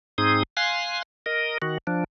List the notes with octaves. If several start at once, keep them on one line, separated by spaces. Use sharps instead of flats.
G#2 C4 D#4 G#4 D#6
F5 G#5 C6 F#6
A#4 D#5
D#3 F#4
F3 D4